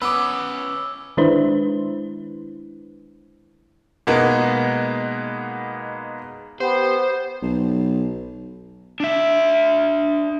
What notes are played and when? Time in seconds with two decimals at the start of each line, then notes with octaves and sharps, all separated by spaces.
0.02 B3 C#4 B4 B5 D6 E6
1.17 D#3 G#3 D4 E4 B4 C5
4.07 B2 G#3 A#3 B3 D#4
6.60 B3 G4 C5
7.42 B1
9.00 D4 E5